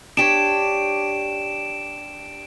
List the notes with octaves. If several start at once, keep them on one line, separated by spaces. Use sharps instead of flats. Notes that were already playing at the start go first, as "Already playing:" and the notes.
D4 G4 C#5 D7 E7